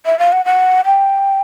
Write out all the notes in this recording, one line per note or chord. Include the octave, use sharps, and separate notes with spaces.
E5
F5
F#5
F#5
G5